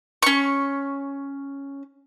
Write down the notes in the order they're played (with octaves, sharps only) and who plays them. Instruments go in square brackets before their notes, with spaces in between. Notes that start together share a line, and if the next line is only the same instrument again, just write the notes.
[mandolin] C#4 C#6